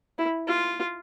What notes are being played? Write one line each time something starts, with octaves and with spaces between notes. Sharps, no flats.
E4
F4